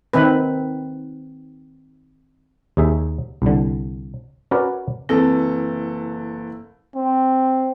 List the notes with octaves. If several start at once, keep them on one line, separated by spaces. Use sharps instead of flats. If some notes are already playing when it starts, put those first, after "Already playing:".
D#3 C4 B4
D#2 D#4 G#4 E5
C2 D3
C#4 F#4 A#4 B4 C#5 D5
F#1 E3 C4 A4
C4